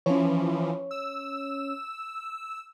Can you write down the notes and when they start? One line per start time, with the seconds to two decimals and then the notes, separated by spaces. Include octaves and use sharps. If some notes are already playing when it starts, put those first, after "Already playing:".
0.06 E3 F3 C#4 C#5
0.91 E6